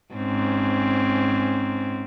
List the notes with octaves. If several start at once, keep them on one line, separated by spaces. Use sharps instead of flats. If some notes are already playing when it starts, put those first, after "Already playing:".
G#2 C4 C#4